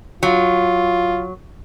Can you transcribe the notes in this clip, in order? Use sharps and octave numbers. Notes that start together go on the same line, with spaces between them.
F#3 F4